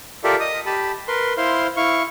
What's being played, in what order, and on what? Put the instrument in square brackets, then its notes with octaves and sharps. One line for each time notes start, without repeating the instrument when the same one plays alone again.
[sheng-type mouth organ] F4 G4 A4 A#4 D5 E5
D#5 D#6
G4 A5 B5
A#4 B4 C6
E4 C5 F5 C6
E4 F5 C#6